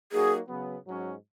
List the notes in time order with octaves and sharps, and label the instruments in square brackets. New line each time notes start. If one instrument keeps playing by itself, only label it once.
[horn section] F#3 A#3 D#4 F#4 A#4 [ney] G#4
[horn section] C#3 F#3 B3
G#2 F#3 C#4